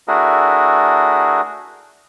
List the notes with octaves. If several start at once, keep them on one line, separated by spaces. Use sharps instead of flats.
A3 D4 E4 F#4 G#4 A#4